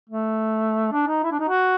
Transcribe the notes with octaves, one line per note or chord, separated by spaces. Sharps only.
A3
D4
D#4
E4
D4
D#4
F#4